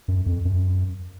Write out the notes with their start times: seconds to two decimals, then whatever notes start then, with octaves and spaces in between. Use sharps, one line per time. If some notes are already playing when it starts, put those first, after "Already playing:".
0.08 F#2
0.26 F2
0.45 F#2